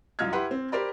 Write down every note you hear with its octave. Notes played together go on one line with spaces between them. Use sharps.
C2 F#2 F4 D#5 F6 G#6
E4 G4 B4 F#5 C6
C4
G4 A#4 C5 D5 B5